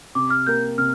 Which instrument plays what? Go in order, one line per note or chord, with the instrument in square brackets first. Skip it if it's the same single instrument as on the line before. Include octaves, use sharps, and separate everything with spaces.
[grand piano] C3 [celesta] D6
[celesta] F6
[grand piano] A#3 G4 A#4 [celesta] G6
[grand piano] C3 [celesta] F6